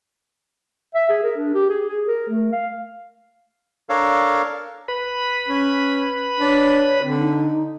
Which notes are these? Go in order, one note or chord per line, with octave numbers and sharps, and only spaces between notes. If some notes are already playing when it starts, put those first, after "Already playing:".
E5
G#4
A#4
D4
G4
G#4
G#4
A#4
A3
F5
D4 A4 A#4 C#5 F5
B4 B5
C#4
D4 C#5
D3 C4
D#4